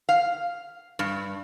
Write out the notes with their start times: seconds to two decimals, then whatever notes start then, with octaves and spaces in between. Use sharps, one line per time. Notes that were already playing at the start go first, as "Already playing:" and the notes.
0.09 F5
0.99 G2